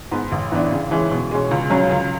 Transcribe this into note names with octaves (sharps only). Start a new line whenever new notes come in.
G#2 G#3 B3
A1
G#2 E3 B3 D4
C#3
E3 G#3 C#4
B2
G#3 C#4
C#2
C#3 F#3 C#4
C#2